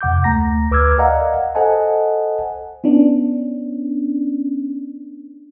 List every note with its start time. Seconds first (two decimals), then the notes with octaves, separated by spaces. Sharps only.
0.01 F2 C3 F#5 D6 G6
0.24 D2 A3 A#5 A#6
0.71 D2 B4 D6 E6 F6 G#6
0.98 A#4 D5 D#5 F5 F#5 A#5
1.55 A4 C5 D#5 F#5 G#5 A5
2.84 B3 C#4 D4